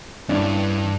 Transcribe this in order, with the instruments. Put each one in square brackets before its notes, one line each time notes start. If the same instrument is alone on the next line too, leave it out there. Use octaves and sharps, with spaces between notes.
[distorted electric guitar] G2 [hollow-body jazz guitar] E3 C#4 D4